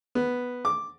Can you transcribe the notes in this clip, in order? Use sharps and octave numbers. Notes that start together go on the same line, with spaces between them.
B3
D6